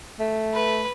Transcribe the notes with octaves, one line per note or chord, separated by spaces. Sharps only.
A3
B4